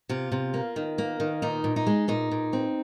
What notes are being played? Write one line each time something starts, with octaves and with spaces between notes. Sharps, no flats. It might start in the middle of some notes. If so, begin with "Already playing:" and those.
C3 F4
C3
A#3
D#3
A#3
D#3
A#2 D#4
A#2
D#4
G#3
A#2 D#4
A#2
C4